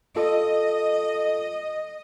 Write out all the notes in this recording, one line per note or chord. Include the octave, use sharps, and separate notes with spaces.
F4 A4 D#5